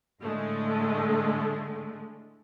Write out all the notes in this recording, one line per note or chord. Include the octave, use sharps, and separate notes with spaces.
A2 D3 G#3 A3